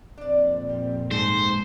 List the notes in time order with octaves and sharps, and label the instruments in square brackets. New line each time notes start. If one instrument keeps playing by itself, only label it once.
[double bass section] F2 A#2 C4 [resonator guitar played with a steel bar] D4 D5
[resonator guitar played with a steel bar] G3
[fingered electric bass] G#2 [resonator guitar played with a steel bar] A4 [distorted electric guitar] C5